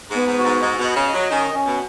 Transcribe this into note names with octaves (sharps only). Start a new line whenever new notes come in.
G#2
B3
G#2
F#4
G#2
G#2 D#5
B2
D#5
C#3
D#5
F#3
D#3 C#4
C#4
B2